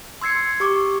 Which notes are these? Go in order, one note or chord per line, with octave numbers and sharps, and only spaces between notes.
C6 E6 G#6 C7 C#7
G4 C#6 D6